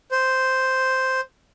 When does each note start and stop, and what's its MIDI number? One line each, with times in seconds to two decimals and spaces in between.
0.11 1.21 72